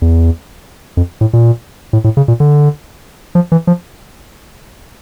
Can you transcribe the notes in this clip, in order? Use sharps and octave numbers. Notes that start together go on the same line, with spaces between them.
E2
F2
A2
A#2
A2
A2
C#3
A#2
D3
F3
E3
F3